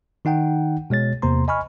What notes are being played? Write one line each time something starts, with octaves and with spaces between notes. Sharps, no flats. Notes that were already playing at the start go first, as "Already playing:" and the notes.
D#3 D#4 F#5 G5
B2 G#3 C#5 A6
E2 C3 A#3 C5 A#5 C6
D#5 G#5 B5 C#6 F6